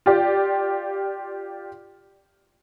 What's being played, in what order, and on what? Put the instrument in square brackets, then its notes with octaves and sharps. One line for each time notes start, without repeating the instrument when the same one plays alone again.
[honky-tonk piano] F4 G4 D5